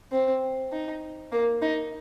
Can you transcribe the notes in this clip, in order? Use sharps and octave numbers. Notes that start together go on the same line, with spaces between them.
C4
D#4
A#3
D#4